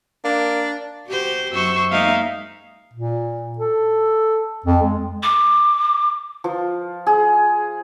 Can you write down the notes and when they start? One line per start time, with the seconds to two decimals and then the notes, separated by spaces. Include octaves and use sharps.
0.24 A#3 D4
1.07 F#4 G4 C5
1.53 F#2 C5 C#6 E6
1.92 G#3 A#3 D#4 E5 F5
2.93 A#2
3.59 A4
4.66 F2
4.83 G#3
5.23 D6
6.44 F3
7.06 G#4